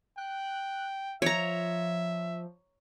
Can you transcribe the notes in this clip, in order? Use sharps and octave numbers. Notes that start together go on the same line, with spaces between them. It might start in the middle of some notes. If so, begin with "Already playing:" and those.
G5 F#6
F3 C#5 E5 A#5